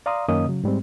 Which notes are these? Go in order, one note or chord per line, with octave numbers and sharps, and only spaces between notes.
D5 F5 A#5 C6 D#6
F#2 D#3 A#3 C#4 D#5 D#6
C#3 F#3
G#2 G3 G#3 C4